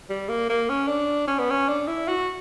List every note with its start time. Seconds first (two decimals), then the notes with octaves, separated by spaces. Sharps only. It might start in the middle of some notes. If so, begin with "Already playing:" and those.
0.09 G3
0.29 A#3
0.49 A#3
0.69 C#4
0.88 D4
1.27 C#4
1.38 B3
1.50 C#4
1.68 D4
1.87 E4
2.08 F#4